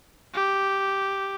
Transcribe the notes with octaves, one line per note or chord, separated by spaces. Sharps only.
G4